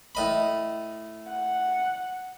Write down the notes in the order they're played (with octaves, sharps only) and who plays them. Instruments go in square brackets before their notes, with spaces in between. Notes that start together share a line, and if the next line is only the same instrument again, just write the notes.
[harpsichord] A2 D#5 B5
[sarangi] F#5